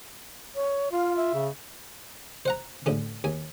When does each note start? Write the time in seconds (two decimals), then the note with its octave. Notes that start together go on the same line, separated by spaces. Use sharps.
0.55 C#5
0.92 F4 F5
1.16 E5
1.34 C#3
2.46 C5 F#5 A#5
2.86 A1 D3 C#4
3.24 D#2 G#5